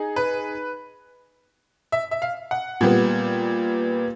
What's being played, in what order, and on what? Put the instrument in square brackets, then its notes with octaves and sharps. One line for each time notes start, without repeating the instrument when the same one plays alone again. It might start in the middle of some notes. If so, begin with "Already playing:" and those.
Already playing: [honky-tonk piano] D#4 G#4
[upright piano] B4
E5
E5
F5
F#5
[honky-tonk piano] A#2 G3 B3